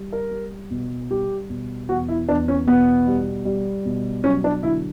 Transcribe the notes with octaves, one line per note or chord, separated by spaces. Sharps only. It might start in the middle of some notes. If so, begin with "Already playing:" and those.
Already playing: G3
A#4
G3
B2
G3 G4
B2
E2 F#4
E4
E2 D4
C#4
B2 B3
G3
G3
B2
F#3 C#4
D4
D3 E4